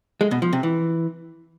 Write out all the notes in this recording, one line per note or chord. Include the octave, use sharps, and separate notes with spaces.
G#3
B2
F3
C3
E3